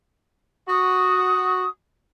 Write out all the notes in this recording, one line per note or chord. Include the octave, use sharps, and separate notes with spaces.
F#4 D#6